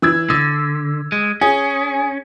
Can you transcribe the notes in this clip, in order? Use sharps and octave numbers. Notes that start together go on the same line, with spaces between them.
E3 E6 G#6
D3 E6
G#3
C#4 G#4